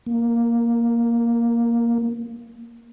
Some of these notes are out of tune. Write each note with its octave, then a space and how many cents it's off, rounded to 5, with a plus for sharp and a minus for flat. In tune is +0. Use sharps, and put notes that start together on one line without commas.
A#3 +5